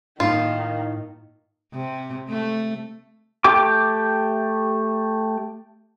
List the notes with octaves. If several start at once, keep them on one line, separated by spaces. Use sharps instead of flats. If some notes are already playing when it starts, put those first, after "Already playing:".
A2 D#3 A#3 D#4 F4
C3
A3
A3 G4 G5 D6